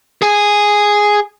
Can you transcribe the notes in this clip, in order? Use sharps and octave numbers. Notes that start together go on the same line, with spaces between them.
G#4 G#5